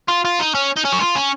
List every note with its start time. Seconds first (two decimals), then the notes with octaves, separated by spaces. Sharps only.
0.08 F4
0.25 F4
0.39 D#4
0.55 C#4
0.76 D#4
0.85 C#4
0.93 F#4
1.00 F4
1.16 C#4